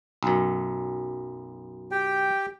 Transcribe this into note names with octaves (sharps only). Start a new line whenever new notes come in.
B1 F#2
G4 G5